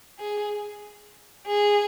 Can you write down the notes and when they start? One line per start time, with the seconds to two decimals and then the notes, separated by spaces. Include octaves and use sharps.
0.19 G#4
1.47 G#4